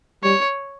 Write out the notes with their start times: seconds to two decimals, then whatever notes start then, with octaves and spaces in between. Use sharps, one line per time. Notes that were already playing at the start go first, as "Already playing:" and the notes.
0.23 G3 C#5